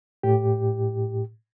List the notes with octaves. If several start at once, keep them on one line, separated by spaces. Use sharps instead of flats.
A2 G4